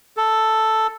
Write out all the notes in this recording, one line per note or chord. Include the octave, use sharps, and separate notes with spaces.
A4